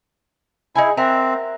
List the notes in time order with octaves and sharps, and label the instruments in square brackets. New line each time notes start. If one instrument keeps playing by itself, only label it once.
[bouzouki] D#4 G#4 G#5 [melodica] E4
[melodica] C4 [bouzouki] A#4 E5 F#5